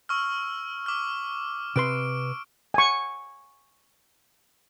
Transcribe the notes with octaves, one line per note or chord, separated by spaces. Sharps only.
C#6 E6 F6
D6 F6
C3 B4 C6 D7
G#5 C#6